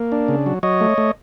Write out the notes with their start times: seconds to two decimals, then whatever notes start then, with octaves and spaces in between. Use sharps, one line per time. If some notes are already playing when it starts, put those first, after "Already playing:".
Already playing: A#3
0.12 D4
0.28 C#3
0.46 F#3
0.63 F#3 C#5 D#5
0.81 A3
0.98 A3